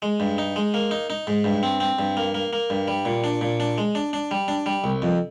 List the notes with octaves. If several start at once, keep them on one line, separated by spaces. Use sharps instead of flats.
G#3
G2
D#4
G#3
A#3
D#4
D#4
G#2
G2
C4
C4
G2
A#3
A#3
A#3
G2
G3
A#2
D4
A#2
D4
G#3
D4
D4
G3
D4
G3
C2
F2